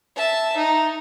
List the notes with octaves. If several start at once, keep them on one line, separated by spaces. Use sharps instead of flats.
E5 A5
D#4